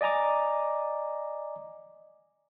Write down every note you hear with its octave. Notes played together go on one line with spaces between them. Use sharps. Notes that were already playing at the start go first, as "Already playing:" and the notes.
D5 D#5 G#5 A#5 D6